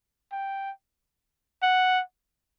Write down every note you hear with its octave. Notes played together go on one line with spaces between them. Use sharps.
G5
F#5